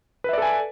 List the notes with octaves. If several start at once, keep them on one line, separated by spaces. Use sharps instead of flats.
A4 B4 D5 E5 G#5